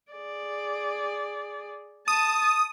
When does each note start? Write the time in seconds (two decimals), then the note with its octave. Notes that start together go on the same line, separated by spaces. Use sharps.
0.12 G#4 D5
2.08 A5 D#6